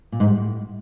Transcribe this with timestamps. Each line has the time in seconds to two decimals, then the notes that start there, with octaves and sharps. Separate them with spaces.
0.12 A#2
0.20 G#2
0.28 G3
0.35 A2